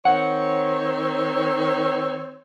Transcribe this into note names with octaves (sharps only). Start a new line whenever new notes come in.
D#3 C4 C#5 F#5